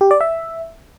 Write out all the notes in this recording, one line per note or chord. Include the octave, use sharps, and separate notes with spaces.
G4
D5
E5